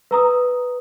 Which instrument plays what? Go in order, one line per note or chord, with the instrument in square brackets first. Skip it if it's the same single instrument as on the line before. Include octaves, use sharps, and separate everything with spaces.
[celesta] B4 A#5 D#6